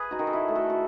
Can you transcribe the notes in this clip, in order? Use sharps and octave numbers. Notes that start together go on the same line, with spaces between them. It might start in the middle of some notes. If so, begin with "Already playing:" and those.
Already playing: G#4 B4
D#4 F#4
D#3
A4
E4 G#4
A3
F#4 A4
F#4